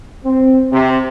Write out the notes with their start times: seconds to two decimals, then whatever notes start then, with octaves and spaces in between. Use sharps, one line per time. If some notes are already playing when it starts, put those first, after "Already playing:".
0.25 C4
0.72 C3